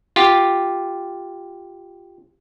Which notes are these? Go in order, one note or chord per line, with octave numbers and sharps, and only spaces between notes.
F4 G4